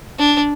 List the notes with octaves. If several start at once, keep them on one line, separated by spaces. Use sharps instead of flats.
D4